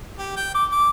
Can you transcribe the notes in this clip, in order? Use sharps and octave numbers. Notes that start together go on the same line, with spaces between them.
G4
G5
D6
D6